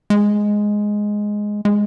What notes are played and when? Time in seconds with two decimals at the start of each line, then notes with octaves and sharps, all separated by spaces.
0.10 G#3
1.65 G#3